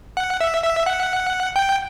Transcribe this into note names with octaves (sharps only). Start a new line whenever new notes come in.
F#5
E5
E5
F#5
G5